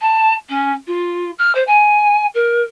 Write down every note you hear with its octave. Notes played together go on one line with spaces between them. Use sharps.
A5
C#4
F4
F6
C5
G#5
A#4